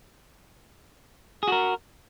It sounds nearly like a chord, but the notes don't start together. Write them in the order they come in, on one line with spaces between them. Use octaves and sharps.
G#4 F#4 A#4